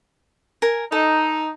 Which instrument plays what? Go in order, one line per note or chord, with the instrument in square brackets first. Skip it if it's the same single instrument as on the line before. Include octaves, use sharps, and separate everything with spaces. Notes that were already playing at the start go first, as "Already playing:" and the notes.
[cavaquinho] A#4 G#5
[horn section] D#4 [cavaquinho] A4